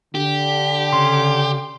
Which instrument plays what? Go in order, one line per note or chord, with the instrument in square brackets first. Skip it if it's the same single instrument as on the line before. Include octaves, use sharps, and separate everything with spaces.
[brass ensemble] D3 [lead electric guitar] G4
[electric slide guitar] C#3 C#4 [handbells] C6